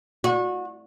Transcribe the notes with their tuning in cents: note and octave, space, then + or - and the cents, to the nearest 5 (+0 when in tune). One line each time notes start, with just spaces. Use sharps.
F#4 -30